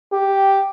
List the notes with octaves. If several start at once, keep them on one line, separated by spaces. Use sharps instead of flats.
G4